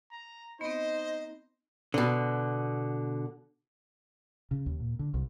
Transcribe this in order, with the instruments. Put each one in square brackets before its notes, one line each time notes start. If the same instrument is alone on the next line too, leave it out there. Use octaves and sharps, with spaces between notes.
[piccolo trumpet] A#5
[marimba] B3 C4 [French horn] D#4 [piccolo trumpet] C5 [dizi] D#5
[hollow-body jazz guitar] B2 D3
[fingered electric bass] C#3
D#2
A#2
D3
C2